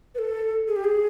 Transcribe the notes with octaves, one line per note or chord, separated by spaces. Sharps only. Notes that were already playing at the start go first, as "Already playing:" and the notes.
B4
A4
G#4
G4
G#4